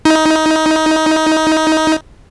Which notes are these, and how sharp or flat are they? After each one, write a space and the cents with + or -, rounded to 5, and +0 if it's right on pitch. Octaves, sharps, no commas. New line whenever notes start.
D#4 +20